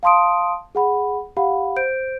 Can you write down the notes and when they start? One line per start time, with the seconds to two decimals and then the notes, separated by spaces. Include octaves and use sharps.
0.03 F5 A5 C6 D#6 D7
0.75 G#4 F#5 B5
1.37 G4 F5 F#5 B5
1.76 C5 G6 D7